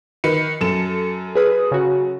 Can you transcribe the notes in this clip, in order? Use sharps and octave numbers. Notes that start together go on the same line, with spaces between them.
D#3 B4 C#7
F#2 A4 E7
G#4 B4 D#6
C#3 F#4